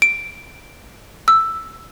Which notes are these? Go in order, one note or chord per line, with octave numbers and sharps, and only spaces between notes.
D7
E6